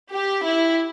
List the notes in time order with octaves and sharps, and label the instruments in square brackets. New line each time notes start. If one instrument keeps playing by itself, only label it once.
[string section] G4
E4